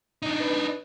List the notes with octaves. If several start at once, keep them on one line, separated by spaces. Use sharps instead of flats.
D4 D#4 D#5
B4